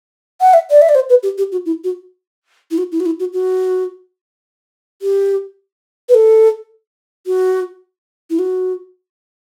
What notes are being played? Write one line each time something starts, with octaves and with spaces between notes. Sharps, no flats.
F#5
E5
D5
E5
D5
C5
B4
G4
G4
F#4
E4
F#4
E4
F#4
E4
F#4
E4
F#4
F#4
G4
B4
A4
F#4
E4
F#4